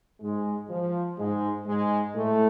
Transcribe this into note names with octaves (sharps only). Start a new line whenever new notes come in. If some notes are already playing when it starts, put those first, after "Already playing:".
G#2 G#3
F3
G#2 G#3
G#2 G#3
A2 A3